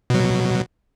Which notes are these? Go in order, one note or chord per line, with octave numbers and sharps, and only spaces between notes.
B2 F#3